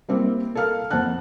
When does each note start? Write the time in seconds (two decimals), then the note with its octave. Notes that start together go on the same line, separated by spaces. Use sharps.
0.09 G3 A#3 C4 E4
0.55 A4 A#4 F5 F6
0.90 F2 C5 F#5 A5 F#6